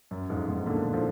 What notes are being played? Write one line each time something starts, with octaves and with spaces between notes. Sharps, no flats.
F#2
F2 G#2
G#2 B2
A#2 D3
D3 F3